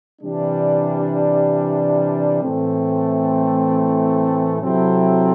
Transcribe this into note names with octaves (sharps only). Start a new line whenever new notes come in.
C3 E3 G3 D4
A2 E3 A3 C4
C3 F#3 C4 E4 A4